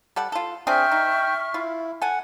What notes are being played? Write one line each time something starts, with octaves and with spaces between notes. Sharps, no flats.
G3 A4 F#5
F4 A4
C4 D4 G#4 E5 G5 C#6 F6
D#4
E4 F4
A4 F#5 G#5